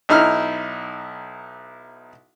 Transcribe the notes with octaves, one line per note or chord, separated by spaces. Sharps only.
B1 D#4 E4 F6